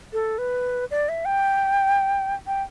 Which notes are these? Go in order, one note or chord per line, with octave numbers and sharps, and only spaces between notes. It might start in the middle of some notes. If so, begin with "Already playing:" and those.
A4
B4
D5
E5
G5
G5